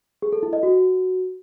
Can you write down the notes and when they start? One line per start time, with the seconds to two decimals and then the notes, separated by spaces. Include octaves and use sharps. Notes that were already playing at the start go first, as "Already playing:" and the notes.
0.22 G#4
0.33 A4
0.43 E4
0.53 D#5
0.63 F#4